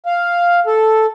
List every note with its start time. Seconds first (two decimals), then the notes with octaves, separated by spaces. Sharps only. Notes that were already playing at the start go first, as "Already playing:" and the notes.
0.06 F5
0.66 A4